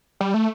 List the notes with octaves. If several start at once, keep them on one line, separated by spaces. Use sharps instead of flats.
G3
A3